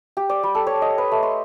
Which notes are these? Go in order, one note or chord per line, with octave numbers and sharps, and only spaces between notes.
G4
D5
G3
A4
C#5
D#5
B4
A3
C6